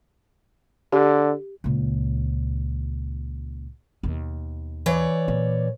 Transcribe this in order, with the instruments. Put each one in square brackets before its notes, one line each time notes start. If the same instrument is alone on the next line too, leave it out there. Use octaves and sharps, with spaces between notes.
[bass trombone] D3 [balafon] G4
[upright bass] C#2 A#2
D#2 B2
[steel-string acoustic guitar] E3 C#5 D5
[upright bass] A#2